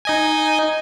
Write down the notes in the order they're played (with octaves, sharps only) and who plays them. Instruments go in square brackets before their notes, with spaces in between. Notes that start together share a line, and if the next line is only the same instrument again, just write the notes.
[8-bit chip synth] D#4 D#5 G#5